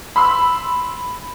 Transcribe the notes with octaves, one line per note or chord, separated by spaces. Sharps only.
B5 C6 E6